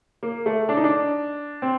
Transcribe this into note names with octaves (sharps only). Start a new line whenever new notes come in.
A#3
A3
D4
D#4
D4
C4